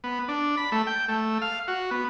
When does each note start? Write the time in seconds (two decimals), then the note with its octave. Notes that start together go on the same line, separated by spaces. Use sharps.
0.04 B3
0.28 D4
0.57 B5
0.72 A3
0.87 G5
1.08 A3
1.42 F5
1.68 F#4
1.91 B3